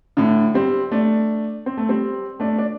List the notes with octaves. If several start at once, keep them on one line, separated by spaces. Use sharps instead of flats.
A2 D3
G3 C4
A3 D4
C4
A3
G3 C4
A3 D4
D4